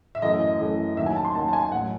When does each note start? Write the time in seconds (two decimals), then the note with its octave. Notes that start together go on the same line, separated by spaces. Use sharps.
0.15 E5
0.22 F#2 E3 A3 D#5
0.40 D#5
0.59 F#2 E3 A3
0.97 D#2 D#3 F#3 E5
1.06 G#5
1.16 A5
1.25 C6
1.35 D#2 D#3 F#3 A5
1.48 A5
1.53 G#5
1.72 A1 F#3 F#5